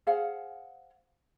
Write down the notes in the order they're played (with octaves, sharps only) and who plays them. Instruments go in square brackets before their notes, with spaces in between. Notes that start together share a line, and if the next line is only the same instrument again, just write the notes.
[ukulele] G#4 C5 F5 F#5